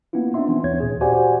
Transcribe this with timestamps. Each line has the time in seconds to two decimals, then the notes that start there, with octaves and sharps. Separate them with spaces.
0.13 A#3 B3 C#4 E4 F4
0.34 C4 D4 D#4 E5 C6
0.48 E3 B3 C#4
0.64 D#2 E3 C#5 G#6
0.80 D2 A#2 G#4
1.01 F#4 G4 C5 D5 F#5 G#5